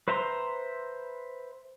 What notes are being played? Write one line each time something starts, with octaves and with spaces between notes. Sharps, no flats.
B4 C5 E5 A#5 C6